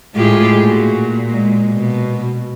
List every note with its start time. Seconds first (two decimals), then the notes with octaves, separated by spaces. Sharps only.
0.15 A2 G#3 F4 G4 G#4
0.63 A#2 F#4
1.29 G#3
1.73 B2